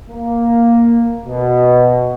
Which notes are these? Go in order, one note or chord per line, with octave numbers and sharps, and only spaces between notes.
A#3
B2